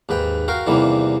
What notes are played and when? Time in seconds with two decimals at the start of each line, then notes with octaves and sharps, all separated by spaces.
0.09 D#2 G#2 B4 G5
0.48 F#4 A#4 F5 G5 C6
0.66 E2 C3 D#3 E3 G3 A#3